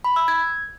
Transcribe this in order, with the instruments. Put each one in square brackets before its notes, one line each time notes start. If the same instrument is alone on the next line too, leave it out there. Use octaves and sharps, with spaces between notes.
[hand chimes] B5
E6
G#6